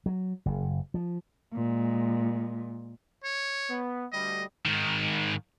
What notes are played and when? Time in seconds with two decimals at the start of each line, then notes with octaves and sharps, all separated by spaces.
0.06 F#3
0.46 F#1
0.94 F3
1.53 A#2 G#3
3.24 C#5
3.69 B3
4.13 D2 G3 D#5
4.66 G#2 D#3